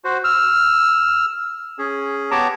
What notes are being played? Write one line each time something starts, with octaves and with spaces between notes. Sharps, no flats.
F#4 C5
E6 F6
C#4 G#4
B3 G4 C#5 A5 A#5 D6